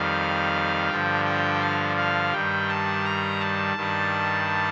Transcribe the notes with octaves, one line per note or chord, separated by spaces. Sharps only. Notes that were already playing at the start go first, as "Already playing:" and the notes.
Already playing: F2 D#3 G3 F5
G2 D3 F3 G5
G5
F5
F5
G2 D#3 G3 G5
A5
A#5
A5
G2 D#3 G3